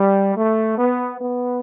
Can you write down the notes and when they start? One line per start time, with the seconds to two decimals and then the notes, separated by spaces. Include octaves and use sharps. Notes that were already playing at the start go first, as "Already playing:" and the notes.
Already playing: G3
0.36 A3
0.78 B3
1.21 B3